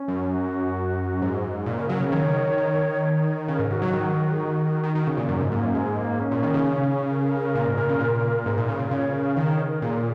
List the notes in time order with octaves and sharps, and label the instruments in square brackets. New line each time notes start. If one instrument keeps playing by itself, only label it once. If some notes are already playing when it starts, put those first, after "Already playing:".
Already playing: [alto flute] C#4
[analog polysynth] F#2
[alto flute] F#4
[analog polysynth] G#2
A#2
[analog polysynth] C#3 [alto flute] A#4
[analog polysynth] F#3 [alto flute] A#4
[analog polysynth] C#3 [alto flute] A#4
[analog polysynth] D#3 [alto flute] C#5
[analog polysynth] D#3
[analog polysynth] C#3 [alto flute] A#4
[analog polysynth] G#2
[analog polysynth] G#2 [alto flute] F#4
[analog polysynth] F#3
D#3
[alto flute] G#4
F#4
[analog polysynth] D#3
D#3
C#3
A#2
[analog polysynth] F#2 [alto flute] C#4
[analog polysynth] G#2 [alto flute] G#3
[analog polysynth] G#2 [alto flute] A#3
[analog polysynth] F#2
[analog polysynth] G#2 [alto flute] G#3
[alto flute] A#3
C#4
[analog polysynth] A#2
D#3
C#3
[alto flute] A#4
G#4
A#4
[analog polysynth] A#2
G#2
A#2
C#3
A#2
G#2
A#2
C#3
A#2
[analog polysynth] C#3 [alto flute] C#5
[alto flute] A#4
[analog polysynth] D#3 [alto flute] A#4
[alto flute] C#5
A#4
[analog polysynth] A#2 [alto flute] G#4